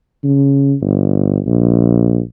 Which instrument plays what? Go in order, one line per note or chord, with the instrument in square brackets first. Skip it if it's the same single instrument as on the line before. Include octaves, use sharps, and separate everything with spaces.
[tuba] C#3
G1
A#1